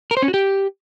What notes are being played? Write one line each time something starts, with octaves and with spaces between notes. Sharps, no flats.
A#4
C5
C#4
F#4
G4